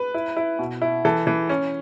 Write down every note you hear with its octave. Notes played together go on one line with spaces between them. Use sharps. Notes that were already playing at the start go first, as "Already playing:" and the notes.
Already playing: B4
E4
E4
B2
E4
E3 A4
E3
C#4